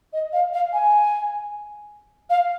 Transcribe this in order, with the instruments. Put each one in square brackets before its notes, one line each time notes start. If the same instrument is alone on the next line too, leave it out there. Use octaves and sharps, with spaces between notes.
[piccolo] D#5
F5
F5
G#5
F5